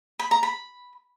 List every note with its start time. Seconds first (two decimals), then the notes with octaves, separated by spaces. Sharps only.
0.19 B5
0.31 A#5
0.43 B5